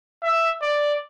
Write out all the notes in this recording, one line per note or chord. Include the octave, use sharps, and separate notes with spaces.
E5
D5